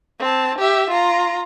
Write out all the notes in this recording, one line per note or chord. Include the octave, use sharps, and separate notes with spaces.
C4 A5
G4 E5
F4 A#5